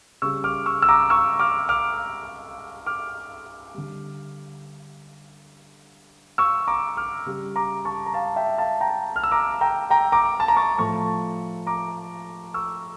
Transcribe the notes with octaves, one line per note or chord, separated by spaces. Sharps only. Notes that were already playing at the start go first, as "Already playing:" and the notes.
C#3 G3 C#6 E6
D6 F6
C#6 E6
E6
A#5 D6
C#6 E6
D6 F6
D6 F6
D6 F6
D3 G3
C#6 E6
A#5 D6
D6 F6
C#3 G3
A#5 D6
A5 C#6
A#5
F5 A5
E5 G5
F5 A5
G5 A#5
F6
E6
A#5 D6
G5 A#5
G5 A#5
A#5 D6
A5
A#5
A5 C#6
A2 F3 A3 A5 C#6
A#5 D6
C#6 E6